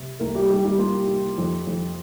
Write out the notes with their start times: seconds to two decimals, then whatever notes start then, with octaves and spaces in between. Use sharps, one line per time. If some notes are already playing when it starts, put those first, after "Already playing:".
Already playing: C3
0.20 C2 A#3 A#4
0.35 G3 G4
0.50 C2 G3 G4
0.64 G3 G4
0.78 A#3 F4
1.08 A#2
1.38 F2
1.67 F2